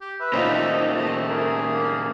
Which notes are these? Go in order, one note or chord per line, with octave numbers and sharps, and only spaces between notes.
G4
B4 E5
A#2 C#4 D#4 F4 C5
A3 D#5
G#4 A#4
A#3